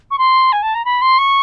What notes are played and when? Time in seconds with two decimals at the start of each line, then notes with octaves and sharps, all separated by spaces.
0.10 C#6
0.18 C6
0.52 G#5
0.62 A5
0.74 A#5
0.85 B5
1.01 C6
1.18 C#6